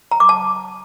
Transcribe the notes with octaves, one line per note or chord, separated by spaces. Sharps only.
A#5
D6
A5